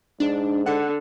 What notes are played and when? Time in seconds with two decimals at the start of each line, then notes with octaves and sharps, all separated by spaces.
0.20 G#2 D4
0.66 D3 F#5